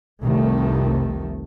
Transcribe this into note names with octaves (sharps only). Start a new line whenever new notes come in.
F1 C2 D#3 A3